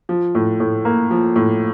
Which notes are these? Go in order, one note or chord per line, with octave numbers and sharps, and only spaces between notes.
F3
A2
A2
A#3
F3
A2